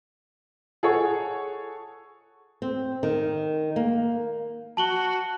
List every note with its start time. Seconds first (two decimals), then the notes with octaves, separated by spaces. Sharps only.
0.83 G#4 A4 C#5 F#5
2.62 C4
3.03 D#3
3.76 A#3
4.77 F#4 A5 F#7 G7